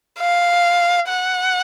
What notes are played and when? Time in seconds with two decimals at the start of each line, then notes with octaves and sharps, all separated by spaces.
0.20 F5
1.08 F#5